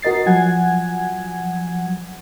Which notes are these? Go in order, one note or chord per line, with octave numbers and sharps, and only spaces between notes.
F#4 A#4 D#5 A6 C7
F3 F#3 F#5 G#5 G#6